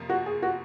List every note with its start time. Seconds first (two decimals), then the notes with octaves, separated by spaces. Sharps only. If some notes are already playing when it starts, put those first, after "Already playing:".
Already playing: F2 C3 F3 A#3
0.10 F#4
0.26 G#4
0.43 F#4